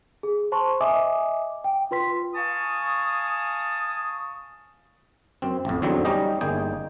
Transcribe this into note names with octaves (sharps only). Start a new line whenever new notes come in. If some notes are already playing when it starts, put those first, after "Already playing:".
G#4
C5 A5 C6 C#6
D#5 E5 G#5 D6 D#6
G5
F4 B4 C6 B6
F5 G#5 A5 C#6 D#6
F#2 C4
A1 F2
E2 D3 F#3 C4 D#4
G3 C#4 D#4 G4 D#5
G1 A#3 D#4 G#4 G5